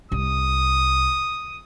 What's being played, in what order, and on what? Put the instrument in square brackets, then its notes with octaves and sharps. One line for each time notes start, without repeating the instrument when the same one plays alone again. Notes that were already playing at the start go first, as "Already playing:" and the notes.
[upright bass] C2 [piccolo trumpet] D#6